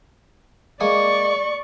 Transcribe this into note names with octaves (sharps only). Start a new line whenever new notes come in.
G#3 A#3 G#4 D5 C#6